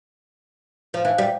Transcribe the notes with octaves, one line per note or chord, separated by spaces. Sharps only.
F3
E3
G3